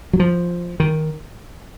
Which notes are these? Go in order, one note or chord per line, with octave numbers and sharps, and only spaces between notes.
F#3
F3
D#3